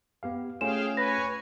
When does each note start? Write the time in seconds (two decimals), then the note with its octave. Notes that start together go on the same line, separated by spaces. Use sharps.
0.23 B3 G4 F5
0.61 A3 C#4 F4 G#4 F5 G5 E7
0.97 B4 C#5 G#5 A#6